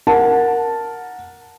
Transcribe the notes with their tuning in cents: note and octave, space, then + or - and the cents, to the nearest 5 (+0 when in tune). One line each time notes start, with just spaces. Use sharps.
A#4 +0 F#5 -15 A5 +0